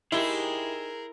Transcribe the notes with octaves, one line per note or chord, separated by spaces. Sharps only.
D#4 E4 G4 G#4 A#4 C5